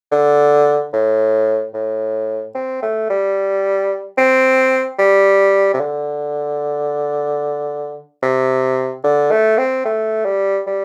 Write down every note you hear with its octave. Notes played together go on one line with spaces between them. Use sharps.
D3
A2
A2
C4
A3
G3
C4
G3
C3
D3
C3
D3
A3
C4
A3
G3
G3